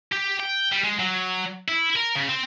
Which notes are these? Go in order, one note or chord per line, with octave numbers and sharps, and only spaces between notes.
G4
G5
G3
G#3
F#3
E4
A#4
C#3
C4